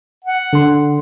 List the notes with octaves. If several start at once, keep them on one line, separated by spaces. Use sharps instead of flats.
F#5
D3 C6